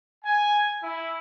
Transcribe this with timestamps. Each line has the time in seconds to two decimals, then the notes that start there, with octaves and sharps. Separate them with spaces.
0.24 G#5
0.82 E4